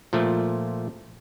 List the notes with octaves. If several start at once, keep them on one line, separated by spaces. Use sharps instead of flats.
A#2 F3 A3